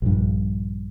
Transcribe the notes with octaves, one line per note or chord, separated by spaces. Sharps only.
A#1 G2